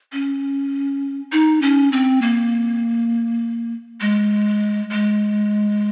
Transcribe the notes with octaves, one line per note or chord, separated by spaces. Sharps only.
C#4
D#4
C#4
C4
A#3
G#3
G#3